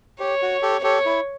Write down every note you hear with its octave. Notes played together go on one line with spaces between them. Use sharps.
G4 C#5
F#4
G4 A4
G4 A4 C#5
E4